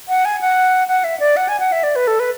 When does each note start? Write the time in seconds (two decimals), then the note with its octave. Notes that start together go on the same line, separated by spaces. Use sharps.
0.08 F#5
0.25 G#5
0.41 F#5
0.88 F#5
1.04 E5
1.20 D5
1.37 F#5
1.48 G#5
1.60 F#5
1.72 E5
1.83 D5
1.96 B4
2.07 A4
2.20 B4